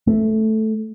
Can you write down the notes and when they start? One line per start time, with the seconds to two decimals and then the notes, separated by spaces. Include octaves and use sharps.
0.07 A3